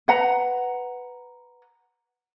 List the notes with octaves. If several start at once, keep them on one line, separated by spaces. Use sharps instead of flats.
B4 F#5 A#5